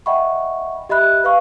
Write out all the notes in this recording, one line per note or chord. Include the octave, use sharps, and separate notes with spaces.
D#5 E5 F#5 G5 B5 C#6
G4 D#5 E5 B5 F#6
B4 F5 C#6